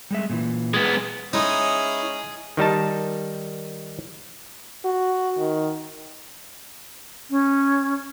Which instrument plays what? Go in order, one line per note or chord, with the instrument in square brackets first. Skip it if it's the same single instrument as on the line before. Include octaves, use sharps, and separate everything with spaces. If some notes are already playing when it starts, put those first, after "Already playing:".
[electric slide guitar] G3 G#3 E5
A#2 D#3 E3
[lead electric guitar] G#3 B3
[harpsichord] G#3 D#4 [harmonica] C#4 [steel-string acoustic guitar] E4 [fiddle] G#4 D#6
[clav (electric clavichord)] D#3 G3 D#4 A5
[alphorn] F#4
D#3
[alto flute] C#4